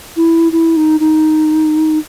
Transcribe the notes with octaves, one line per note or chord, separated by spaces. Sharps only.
E4
E4
D#4
D#4